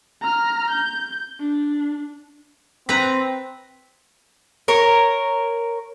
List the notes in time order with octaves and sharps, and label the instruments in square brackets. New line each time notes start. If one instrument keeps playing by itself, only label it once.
[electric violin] A#5 F6
G6
D4
[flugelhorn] C4 [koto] B4 A#5
[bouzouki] A#4 C#5